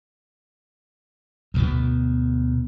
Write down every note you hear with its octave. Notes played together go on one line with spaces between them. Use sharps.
D2 B2 B3